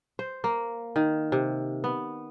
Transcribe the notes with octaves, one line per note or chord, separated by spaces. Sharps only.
C5
A#3
D#3
C3
B3